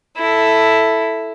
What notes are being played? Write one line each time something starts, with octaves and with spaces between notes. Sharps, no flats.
E4 A4